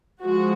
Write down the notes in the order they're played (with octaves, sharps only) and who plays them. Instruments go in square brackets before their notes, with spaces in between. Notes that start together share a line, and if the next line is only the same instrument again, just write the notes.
[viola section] F3 G#3 F#4